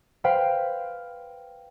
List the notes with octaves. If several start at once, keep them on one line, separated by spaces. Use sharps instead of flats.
B4 C5 F5 G5